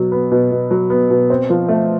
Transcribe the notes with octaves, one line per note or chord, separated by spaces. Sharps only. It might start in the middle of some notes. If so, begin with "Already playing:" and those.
Already playing: B2 F#3
B3
B2
B2
F#3
B3
B2
C4
F3
A3